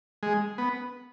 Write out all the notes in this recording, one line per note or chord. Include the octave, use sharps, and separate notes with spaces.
G#3
B3